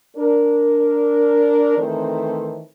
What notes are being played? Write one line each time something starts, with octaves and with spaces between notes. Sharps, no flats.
D4 A#4
D#3 E3 A3 C4 A4 C5